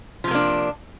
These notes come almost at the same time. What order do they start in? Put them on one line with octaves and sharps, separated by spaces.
F3 C3 A#3 D4